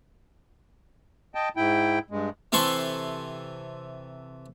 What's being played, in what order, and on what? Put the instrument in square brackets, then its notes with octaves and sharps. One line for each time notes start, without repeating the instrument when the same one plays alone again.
[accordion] D#5 G5 A5
G#2 E4 G5
G2 G#3
[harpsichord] C3 E3 A4 C6 C#6